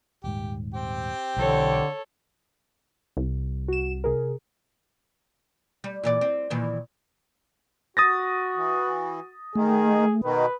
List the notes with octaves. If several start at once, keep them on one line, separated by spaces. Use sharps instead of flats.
D#1 G#2 G4
C4 G4 G5
B1 D3 E3 A4 C#5
C2
F#4 E7
C3 G#4 A#4
G3
A#2 E3 D5
C4
A#2 D#3 E3
F#4 D#6 A6 A#6
E3
D#3 A3 G#4
B2 D#3 B4